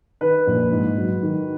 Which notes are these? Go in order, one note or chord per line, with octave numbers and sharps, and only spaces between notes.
D#3 B4
A#1
G#2
F#3
D#3